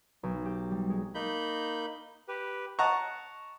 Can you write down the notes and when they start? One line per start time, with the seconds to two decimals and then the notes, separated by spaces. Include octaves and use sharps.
0.23 B1
0.45 G4
0.71 G3
0.90 G#3
1.15 A#3 D#4 B5 G6
2.28 G4 B4
2.79 D#5 F#5 A5 A#5 C#6